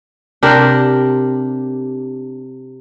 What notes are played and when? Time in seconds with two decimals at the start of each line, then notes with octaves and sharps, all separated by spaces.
0.43 C3 D4 G4 A#4